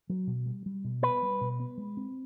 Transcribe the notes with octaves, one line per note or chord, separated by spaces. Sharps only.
F#3
B2
G3
G3
B2
B3 B4
G3
B2
B3
G#3
C4